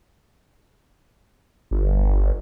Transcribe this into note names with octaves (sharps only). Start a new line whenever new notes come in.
G1